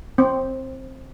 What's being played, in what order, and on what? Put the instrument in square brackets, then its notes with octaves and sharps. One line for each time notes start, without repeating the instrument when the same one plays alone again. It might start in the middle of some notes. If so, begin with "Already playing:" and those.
[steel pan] C4